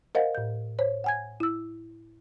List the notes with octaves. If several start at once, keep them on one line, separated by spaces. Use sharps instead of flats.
A#4 C5 D#5 F5 F#5
A2 G6
C5 C#5
F#5 G#5 G#6
E4 E6